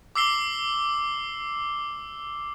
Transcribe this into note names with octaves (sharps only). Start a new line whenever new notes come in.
D6 E6 C7 G7